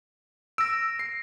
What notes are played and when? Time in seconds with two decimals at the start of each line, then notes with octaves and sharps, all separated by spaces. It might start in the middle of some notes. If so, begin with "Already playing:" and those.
0.58 E6 A#6 D7
0.99 C7